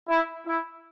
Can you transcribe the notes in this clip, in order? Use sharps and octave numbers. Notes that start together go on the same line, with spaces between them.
E4
E4